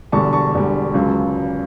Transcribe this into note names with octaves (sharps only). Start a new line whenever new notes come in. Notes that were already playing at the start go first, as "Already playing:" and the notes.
E1 E2 D3 G3 A5 C#6
A5 C#6
E1 E2 D3 G3
C#2 C#3 F#3